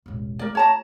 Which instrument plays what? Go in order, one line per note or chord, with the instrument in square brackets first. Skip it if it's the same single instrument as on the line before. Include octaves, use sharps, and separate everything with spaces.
[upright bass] E1 A1
[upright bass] A3 F4 [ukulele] A#4 D5
[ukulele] C#5 A5 A#5